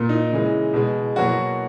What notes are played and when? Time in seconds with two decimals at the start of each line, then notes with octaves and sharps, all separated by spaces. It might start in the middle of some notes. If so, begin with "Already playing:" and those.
Already playing: A#2 A#3
0.09 D#4
0.31 C#3 E3 G#3
0.74 B2 G#3
1.16 B2 F#3 A#3 F#4